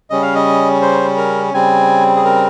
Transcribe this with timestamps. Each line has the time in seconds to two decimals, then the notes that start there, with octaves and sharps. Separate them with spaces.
0.10 C#3 G3 C#4 D#5
0.22 F5
0.35 D#5
0.82 C5
1.17 A#4
1.53 C#3 G3 C4 G#5
2.16 G#4
2.25 A#4